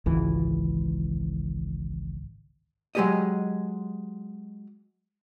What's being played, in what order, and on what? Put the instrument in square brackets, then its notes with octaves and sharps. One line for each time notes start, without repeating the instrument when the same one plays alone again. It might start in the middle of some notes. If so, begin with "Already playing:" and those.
[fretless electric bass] G#1 C#2 E3
[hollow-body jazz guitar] F#3 G#3 A3 G4 D5 D#5